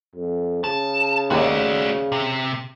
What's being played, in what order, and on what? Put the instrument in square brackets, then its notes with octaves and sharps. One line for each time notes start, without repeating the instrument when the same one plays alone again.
[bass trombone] F2
[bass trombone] C#3 [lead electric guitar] A5
[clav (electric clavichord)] D#2 [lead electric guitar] F#4 D5
[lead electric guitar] C3